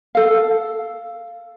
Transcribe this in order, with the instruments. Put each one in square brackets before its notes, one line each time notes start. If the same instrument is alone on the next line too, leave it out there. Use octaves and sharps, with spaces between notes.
[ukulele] A4 F5